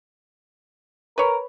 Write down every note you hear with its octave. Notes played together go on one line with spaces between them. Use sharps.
A#4 B4 C#5